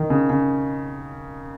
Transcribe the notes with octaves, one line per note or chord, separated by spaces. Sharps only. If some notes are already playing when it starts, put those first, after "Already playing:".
Already playing: D#3
C#3
C#3